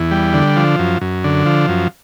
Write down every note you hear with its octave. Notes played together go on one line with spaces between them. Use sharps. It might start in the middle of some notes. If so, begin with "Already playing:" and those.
Already playing: E2
G3
D3
F3
F#2
F#2
D3
F3
F#2